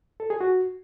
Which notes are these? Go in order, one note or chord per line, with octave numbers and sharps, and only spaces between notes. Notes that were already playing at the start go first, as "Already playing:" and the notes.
A4
G#4
F#4